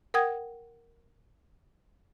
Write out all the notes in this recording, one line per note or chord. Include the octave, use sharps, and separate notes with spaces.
A#4 F#5 G5 D#6 G#6